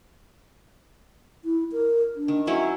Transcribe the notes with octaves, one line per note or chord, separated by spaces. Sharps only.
E4
A#4
D4
D#3
F#3 C#4 E4 E5